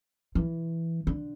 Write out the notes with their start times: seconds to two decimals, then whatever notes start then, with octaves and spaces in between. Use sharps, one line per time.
0.35 E3
1.07 D3